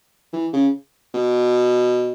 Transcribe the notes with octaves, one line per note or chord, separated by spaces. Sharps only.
E3
C#3
B2